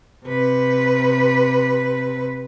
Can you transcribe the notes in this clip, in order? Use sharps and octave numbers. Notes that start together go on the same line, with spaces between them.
C3 B4